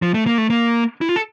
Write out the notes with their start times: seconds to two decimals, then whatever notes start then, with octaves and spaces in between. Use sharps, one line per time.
0.02 F3
0.14 A3
0.26 A#3
0.38 A3
0.50 A#3
1.01 E4
1.09 F4
1.16 A4